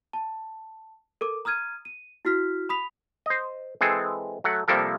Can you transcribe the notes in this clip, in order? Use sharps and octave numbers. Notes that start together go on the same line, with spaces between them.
A5
A4 A#4 D6
A#5 D#6 F6 G#6 D#7
D#7
E4 F#4 F6 B6
B5 D#6 B6 F7
C5 D#5
E3 G#3 C4 G#4 A4
F#3 A3 F#5
C3 F3 G3 A#3 A4 A#4